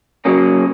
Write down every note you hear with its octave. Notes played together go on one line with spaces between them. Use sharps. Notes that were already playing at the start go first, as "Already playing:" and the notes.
C#3 F#3 A#3 C#4